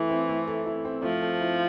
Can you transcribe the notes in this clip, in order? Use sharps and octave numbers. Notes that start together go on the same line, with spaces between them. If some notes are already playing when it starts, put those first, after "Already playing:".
Already playing: E3 A3 E4 A4
C4
A3
A4
E4
C4
F3 A3
A4
E4